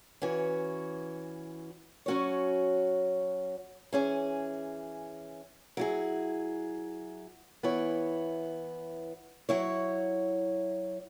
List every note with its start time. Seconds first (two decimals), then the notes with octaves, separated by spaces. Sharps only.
0.22 E3 C#4 F#4
2.06 F#3 C#4 F#4 C#5
3.93 E3 C#4 G#4
5.77 F#3 E4 G#4
7.63 E3 B3 E4 C#5
9.49 F#3 E4 C#5